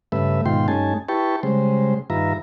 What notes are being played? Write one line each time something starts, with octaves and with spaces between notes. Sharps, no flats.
G2 C#3 A3 B4 E5
G#2 B2 D#3 F4 G5 C6
G2 A3 C#4 D#4 G#5 A5
E4 G4 B4 G5 A5 C#6
C#3 G3 G#3 C5
G2 D#3 F4 B4 E5 A#5